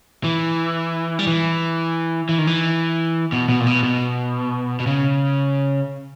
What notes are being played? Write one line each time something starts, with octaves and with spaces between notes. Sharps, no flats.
E3
G3
E3
E3
D#3
E3
B2
B2
A#2
B2
B2
B2
C#3